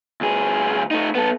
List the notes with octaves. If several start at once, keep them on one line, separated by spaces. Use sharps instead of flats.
D2 G#4
A3 D#4
B3 A4